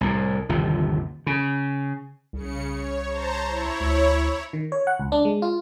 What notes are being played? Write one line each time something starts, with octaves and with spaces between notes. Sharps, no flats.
C2 A2
G1 D#2 C3 F3
C#3
C2 C#3 C#7
C#5
C5 A5 A#5
E4 C#5
D2
D#3
C#5
F#5
C#2
D4
G#3
F4